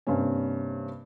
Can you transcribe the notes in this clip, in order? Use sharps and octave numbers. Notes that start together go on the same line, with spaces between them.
G2 C3 A#3 C#4